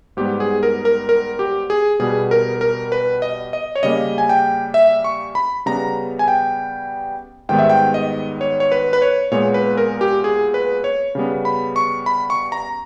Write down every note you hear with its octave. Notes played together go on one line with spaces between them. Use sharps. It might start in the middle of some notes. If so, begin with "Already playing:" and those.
G#2 G3 B3 G4
G#4
A#4
A#4
A#4
G4
G#4
B2 G3 B3 G#4
A#4
A#4
B4
D#5
D#5
C#5
C#3 G3 A#3 D#5
G#5
G5
E5
C#6
B5
C#3 G3 B3 A#5
G#5
G5
G#2 D#3 G3 B3 G5
E5
G5
D#5
C#5
C#5
B4
B4
C#5
A#2 G#3 B3 C#5
B4
A#4
G4
G#4
B4
C#5
C#3 G3 B3
B5
C#6
B5
C#6
A#5